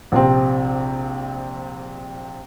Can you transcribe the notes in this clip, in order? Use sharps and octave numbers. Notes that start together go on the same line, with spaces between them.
A#1 C3 C4